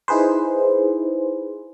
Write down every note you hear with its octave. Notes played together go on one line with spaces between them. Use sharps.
D#4 E4 G#4 B4 C5